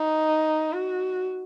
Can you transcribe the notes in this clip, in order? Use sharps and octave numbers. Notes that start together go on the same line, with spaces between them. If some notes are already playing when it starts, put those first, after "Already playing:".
Already playing: D#4
F#4